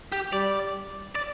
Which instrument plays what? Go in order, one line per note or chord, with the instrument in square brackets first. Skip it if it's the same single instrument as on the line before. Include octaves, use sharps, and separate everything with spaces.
[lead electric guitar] G4
[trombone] G3 [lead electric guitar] D5
[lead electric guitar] D5